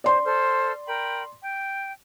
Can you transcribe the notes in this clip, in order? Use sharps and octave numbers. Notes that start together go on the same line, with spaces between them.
C5 D5 C6
A4 C5 F6
A#4 G5 B5
G5